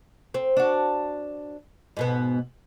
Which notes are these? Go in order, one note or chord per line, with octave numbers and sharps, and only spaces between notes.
C4
D4 F#4
G#2 B2 B3